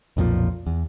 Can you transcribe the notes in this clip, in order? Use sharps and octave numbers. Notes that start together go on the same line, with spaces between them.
B1 F2 A#2 F3
E2